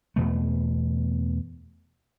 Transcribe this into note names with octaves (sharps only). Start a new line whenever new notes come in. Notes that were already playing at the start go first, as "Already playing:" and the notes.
E2 B2 A3